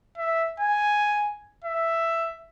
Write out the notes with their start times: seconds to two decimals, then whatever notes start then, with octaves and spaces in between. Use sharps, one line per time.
0.18 E5
0.60 G#5
1.65 E5